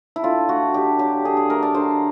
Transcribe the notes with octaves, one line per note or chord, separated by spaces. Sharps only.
E4
D3 F4
A3 F#4
D3 G4
F#3 G4
D3 G#4
G#4
A3 A#4
D5
D3 C5